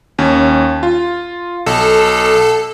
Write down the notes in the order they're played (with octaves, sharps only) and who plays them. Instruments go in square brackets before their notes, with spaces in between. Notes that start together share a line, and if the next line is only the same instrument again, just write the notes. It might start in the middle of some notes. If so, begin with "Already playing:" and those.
[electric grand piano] D#2 C#4
F4
[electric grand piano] B1 [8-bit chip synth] A4